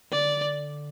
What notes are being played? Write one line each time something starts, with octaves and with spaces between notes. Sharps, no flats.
D3 D5